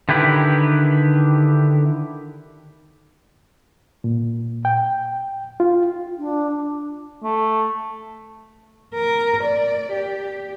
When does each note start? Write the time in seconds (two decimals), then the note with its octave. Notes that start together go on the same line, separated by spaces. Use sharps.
0.09 D3 D#3 E4 G4 B4
4.04 A#2
4.65 G5
5.60 F4
6.18 D4
7.23 A3
8.94 A#4
9.43 D5
9.91 G4